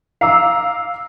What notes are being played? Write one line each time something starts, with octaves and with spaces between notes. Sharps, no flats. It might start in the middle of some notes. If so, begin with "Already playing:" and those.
F5 A#5 D6 E6